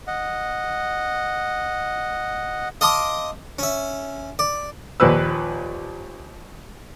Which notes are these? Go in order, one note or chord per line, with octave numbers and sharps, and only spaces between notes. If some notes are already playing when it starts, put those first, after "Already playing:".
D#5 F#5
D#5 F5 A5 C6 D6 D#6
C#4 E5
D5
D#2 A#2 F3 B4 E6